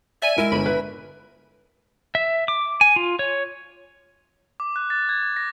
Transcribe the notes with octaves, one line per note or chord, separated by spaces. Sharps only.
D5 E5 G#5 D#7
G#3 E4 A#4
G1 B5
B4
E5
D6
G#5
F4
C#5
D6
F#6
A6
G#6
G#6
A#6